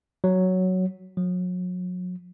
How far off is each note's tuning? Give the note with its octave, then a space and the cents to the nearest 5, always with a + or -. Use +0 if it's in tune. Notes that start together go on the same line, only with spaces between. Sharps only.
F#3 +5
F#3 -35